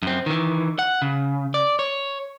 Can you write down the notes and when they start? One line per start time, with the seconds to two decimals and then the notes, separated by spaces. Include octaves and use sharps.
0.02 F#2 C4
0.26 D#3 E3
0.79 F#5
1.02 C#3
1.54 D5
1.79 C#5